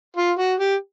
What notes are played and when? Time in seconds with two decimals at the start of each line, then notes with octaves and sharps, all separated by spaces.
0.17 F4
0.39 F#4
0.60 G4